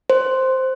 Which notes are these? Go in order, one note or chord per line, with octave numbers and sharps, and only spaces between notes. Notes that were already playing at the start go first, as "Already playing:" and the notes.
C5